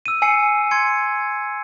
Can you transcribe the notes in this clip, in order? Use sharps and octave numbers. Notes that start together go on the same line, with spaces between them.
E6 D#7
G#5 E6 C7 C#7
C6 G#6 C#7